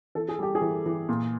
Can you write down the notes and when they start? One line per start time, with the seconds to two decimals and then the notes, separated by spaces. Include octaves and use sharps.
0.15 E3 A4
0.29 G#4
0.39 G3 G4
0.55 G#4
0.61 E3
0.86 E3
1.09 A#2